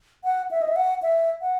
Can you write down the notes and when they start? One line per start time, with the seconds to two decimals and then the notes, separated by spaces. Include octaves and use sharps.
0.24 F#5
0.51 E5
0.62 D#5
0.68 E5
0.76 F#5
1.02 E5
1.41 F#5